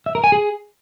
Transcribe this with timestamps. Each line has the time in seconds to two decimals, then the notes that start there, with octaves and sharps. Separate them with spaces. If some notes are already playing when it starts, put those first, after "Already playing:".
0.06 E5
0.15 A#4
0.24 G#5
0.32 G#4